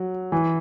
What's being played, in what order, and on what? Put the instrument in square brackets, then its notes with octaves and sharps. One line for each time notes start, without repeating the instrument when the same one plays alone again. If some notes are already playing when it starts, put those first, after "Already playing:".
Already playing: [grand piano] F#3
E3